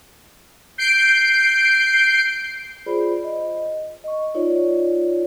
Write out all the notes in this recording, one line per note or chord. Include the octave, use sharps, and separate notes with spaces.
G6 C7 D7
F4 G#4 C5 D5 B5
D#5
D#5 C#6
D#4 F4 C#5 D5